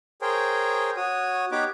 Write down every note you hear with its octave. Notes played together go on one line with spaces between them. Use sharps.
G#4 A#4 C5 C#5 G5
F#4 C#5 D#6
B3 D#4 G4 B4 C#5 D6